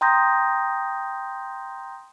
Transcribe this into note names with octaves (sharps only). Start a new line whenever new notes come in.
G5 A#5 C6 D#6 G6 A#6